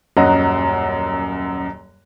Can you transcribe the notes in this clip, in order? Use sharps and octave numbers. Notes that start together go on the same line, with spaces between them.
D#1 F#2 F#3 D#5 A#5 F#6